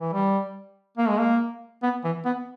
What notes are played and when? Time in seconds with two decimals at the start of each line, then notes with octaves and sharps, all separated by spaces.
0.01 E3
0.13 G3
0.98 A#3
1.09 G#3
1.19 A#3
1.83 B3
2.04 E3
2.25 B3